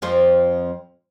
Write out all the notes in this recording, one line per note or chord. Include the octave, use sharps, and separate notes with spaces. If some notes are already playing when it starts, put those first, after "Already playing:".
F2 F3 C4